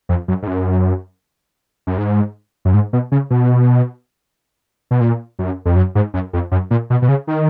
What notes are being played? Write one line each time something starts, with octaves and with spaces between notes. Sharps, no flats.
F2
F#2
G#2
F#2
F#2
G#2
F#2
G#2
B2
C#3
B2
B2
A#2
F#2
F2
F#2
G#2
F#2
F2
F#2
A#2
B2
B2
C#3
D#3